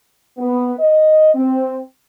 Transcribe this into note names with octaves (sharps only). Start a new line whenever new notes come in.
B3
D#5
C4